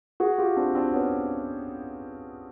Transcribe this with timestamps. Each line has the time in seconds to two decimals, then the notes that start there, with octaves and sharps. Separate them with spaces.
0.20 F#4 G#4
0.38 F4 G4
0.57 C4 D4
0.75 C4 D4
0.93 B3 C#4